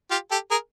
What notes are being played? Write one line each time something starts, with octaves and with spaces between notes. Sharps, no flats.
F4 G4
G4 A4
G#4 A#4